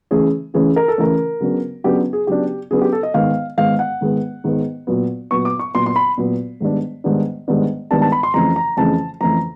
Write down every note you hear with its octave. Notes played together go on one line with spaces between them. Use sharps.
C#3 E3 A3 C#4 G#4
C#3 E3 A3 C#4 G#4
A#4
A4
C#3 E3 A3 C#4 A#4
C#3 F#3 B3 D4
C#3 F#3 B3 D4 G4
G#4
C#3 F#3 B3 D4 G4
C#3 F#3 B3 D4 G#4
G4
A4
D#5
G#2 D#3 G#3 B3 F5
G#2 D#3 G#3 B3 F5
F#5
G#2 D#3 G#3 B3
G#2 D#3 G#3 B3
A#2 F#3 B3
A#2 F#3 B3 C#6
D6
C#6
A#2 F#3 B3 C6
C6
B5
A#2 F#3 B3
G#2 D#3 G3 B3 D4
G#2 D#3 G3 B3 D4
G#2 D#3 G3 B3 D4
G#2 D#3 G3 B3 D4 A5
A5
B5
C6
F2 C#3 E3 A3 A#5
A#5
F2 C#3 E3 A3 A5
F2 C#3 E3 A3 A#5